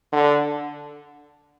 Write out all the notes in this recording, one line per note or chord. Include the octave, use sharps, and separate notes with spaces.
D3